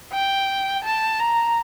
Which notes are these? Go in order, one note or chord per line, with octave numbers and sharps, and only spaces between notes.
G5
A5
A#5